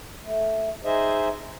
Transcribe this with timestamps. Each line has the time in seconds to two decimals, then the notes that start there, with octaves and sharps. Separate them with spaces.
0.24 A3
0.84 D#4 G#4 C5 D#5 E5